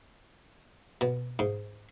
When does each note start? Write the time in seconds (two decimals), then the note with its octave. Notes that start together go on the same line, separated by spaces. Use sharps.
1.01 B2
1.39 G#2